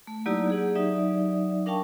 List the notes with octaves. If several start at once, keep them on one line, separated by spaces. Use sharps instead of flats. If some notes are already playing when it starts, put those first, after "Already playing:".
A3
F#3 A#3 D#4 E4 G4 D5
G4 G#4 F#5
F#3 D#4 D5 E5
D4 A#4 F5 G5 A5 C#6